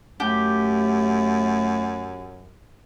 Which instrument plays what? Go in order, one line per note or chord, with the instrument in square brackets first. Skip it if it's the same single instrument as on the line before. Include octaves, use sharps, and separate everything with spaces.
[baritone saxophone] F#2 [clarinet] A3 [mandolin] G4